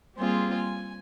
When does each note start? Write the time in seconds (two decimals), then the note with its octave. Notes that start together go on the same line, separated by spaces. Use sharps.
0.17 G3 A#3 C4 F4 G#4
0.55 G#5